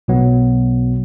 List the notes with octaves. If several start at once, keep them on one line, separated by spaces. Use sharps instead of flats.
B1 B2 F#3 B3